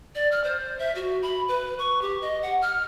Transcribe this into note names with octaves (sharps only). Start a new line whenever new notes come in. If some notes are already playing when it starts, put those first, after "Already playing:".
D5
F6
C5
E5
F#4
B5
B4
C#6
G4
D#5
F#5
F6